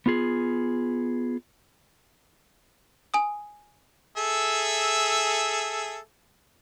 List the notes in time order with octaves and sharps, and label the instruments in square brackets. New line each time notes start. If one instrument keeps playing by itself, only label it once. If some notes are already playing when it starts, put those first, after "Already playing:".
[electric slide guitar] B3 F4 G#4
[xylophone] G#5 D#6
[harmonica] G#4 A4 E5